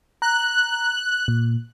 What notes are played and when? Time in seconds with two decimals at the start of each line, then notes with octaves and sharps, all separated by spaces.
0.22 A#5 F#6
1.28 A#2